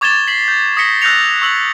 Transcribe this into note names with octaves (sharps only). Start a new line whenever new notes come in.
C#6 D6 G#6 A6 E7 G7
B6 C7 F#7
G6
D#6 A#6 B6 C#7 G7
E6 F#6 G6 A#6 C#7 F7
C#6 E6 F#7